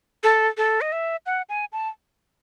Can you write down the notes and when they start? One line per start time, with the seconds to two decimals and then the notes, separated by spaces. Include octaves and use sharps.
0.24 A4
0.58 A4
0.81 D#5
0.92 E5
1.26 F#5
1.49 G#5
1.73 A5